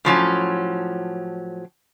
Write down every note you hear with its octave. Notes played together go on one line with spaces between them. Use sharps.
A2 F3 F#3 C#4